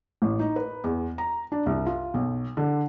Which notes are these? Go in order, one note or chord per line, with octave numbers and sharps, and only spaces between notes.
A1
D#4
B4
E2
A#5
D4
C2
F4
B1
D3